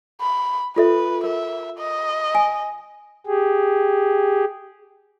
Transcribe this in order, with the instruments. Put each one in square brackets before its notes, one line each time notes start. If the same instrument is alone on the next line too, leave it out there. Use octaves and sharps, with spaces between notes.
[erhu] B5
[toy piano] F4 A4 E5 [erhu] B4
[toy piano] A#4 [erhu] E5
[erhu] D#5
[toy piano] G#5
[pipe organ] G4 G#4